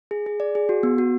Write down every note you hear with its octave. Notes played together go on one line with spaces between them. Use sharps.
G#4
G#4
D5
G#4
F#4
B3
F#4